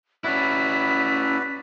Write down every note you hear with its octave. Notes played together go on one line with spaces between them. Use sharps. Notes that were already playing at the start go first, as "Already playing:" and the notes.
C#4 E4 F#4 B4 D5 B6